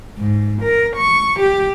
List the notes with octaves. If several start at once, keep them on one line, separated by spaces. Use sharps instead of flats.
G#2
A#4
C#6
G4